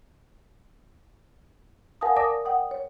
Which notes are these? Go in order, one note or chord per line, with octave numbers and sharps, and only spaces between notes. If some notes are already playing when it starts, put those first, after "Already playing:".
A#4 F5 F#5 G#5 A5 D#6
A#4 D5 A5 D6 D#6 A#6
D5 F#5 G5 D#6
C#5